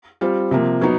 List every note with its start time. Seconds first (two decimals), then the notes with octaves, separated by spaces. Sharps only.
0.21 G3 C4 F4
0.51 C3 F3 A#3
0.81 F#3 B3 D#4